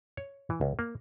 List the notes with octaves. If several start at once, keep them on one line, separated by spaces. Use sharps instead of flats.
C#5
E3
C#2
A#3